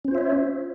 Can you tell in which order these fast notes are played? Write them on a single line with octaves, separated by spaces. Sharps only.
C#4 C5 F4 E5 C#5